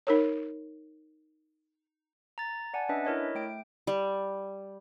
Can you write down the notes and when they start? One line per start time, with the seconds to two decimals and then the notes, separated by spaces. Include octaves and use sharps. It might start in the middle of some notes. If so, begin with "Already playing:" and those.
0.07 D#4 A#4 C#5
2.38 A#5 A6
2.74 D5 F#5 G#5 A5
2.89 C#4 D4 B4 D#5 E5
3.05 E4 A#4 C#5 D#5
3.35 A3 G5 D7
3.87 G3